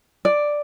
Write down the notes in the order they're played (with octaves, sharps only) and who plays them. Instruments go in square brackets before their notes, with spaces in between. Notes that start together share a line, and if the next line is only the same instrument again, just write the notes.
[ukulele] D5